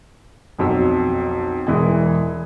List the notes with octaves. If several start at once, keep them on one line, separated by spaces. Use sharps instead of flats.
B1 F2 F#3 E6
E1 E3 G#3 G#5